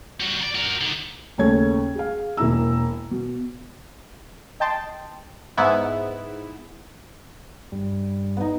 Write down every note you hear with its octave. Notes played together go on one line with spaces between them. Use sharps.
G3 F#4
A#4 D5
F#4 A#4
D3 D#3
D#2 C#3 A3 C#5 G#6
G#4 F5
E1 A#3 E4 A#5 E6
B2
D#5 G5 A5 C6
G#2 B3 E4
G2 G3
B3 D#4